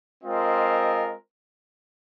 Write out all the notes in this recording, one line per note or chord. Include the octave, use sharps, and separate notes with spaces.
G#3 C4 F4 A#4 D#5